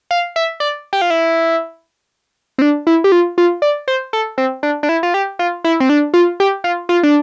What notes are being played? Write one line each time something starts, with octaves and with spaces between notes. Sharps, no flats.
F5
E5
D5
G4
F4
E4
C4
D4
E4
G4
F4
F4
D5
C5
A4
C4
D4
D4
E4
F4
G4
F4
E4
C4
D4
F4
G4
F4
F4
D4